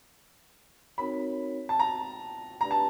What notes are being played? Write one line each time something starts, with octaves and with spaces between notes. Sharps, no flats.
C4 D#4 F#4 A#4 C#5 B5
A5
A#5
A3 D4 G4 B4 D5 A#5
A5